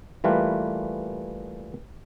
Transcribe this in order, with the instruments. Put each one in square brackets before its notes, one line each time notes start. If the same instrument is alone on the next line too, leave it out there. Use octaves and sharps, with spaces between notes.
[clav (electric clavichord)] E3 G3 A3 A#3 F4 B4